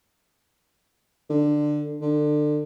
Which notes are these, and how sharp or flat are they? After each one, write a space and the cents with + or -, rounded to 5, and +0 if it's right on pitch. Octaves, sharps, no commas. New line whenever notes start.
D3 +15
D3 +25